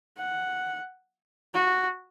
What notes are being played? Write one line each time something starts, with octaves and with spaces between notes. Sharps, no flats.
F#5
F#4